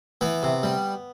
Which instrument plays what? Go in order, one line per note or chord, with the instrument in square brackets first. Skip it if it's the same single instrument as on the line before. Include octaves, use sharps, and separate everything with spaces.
[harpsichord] E3 B3
C3
G3